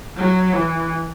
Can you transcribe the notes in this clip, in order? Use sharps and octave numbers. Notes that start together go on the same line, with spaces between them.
F#3
E3